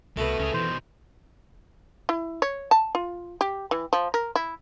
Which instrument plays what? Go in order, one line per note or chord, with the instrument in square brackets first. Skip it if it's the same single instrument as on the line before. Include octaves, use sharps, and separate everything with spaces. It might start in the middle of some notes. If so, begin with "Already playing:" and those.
[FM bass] C2 [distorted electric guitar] B2 B3 [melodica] A3 [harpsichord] A4 B4
[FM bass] C#2 [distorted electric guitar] C#4 G#4
[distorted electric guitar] B2 D#3 [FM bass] E3 [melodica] C5
[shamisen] E4
C#5
A5
F4
G4
E3
F3
A#4
E4